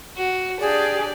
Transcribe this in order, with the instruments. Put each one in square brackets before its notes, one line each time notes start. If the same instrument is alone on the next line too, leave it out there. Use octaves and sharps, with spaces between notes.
[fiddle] F#4
[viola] D4 G4 [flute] G#4 [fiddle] D5